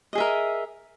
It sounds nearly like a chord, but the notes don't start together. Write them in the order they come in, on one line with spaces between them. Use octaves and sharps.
D#5 G#4 E5 A#4